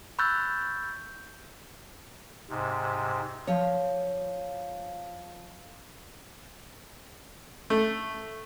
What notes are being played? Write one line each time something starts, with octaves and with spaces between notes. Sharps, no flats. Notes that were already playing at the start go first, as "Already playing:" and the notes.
B5 C#6 E6 F#6 G6 A6
G#2 C3
F3 C#5
A3